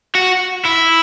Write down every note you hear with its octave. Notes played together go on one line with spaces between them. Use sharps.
F#4
E4